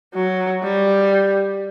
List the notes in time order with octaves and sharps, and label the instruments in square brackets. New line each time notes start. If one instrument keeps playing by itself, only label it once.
[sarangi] F#3
G3